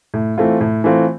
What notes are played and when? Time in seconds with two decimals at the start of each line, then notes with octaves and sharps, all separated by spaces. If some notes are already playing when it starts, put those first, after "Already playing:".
0.14 A2
0.38 E3 A3 C4 F4
0.61 A2
0.84 E3 A3 C4 F4